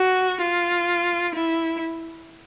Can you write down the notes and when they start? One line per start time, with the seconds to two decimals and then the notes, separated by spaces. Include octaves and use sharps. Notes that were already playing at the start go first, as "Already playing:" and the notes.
Already playing: F#4
0.41 F4
1.36 E4